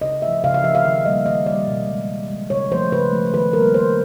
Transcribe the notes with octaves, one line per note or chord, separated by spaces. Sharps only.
C#3 D#5
F3 A3 E5
C#3 F5
F5
F3 A3 E5
F5
D#3 E5
G3 A#3 D#5
D#3 D#5
G3 A#3 D5
B2
G#3
B2
G#3
C#3 C#5
F3 A3 C5
C#3 B4
F3 A3
D#3 B4
G3 A#3 A#4
D#3 C5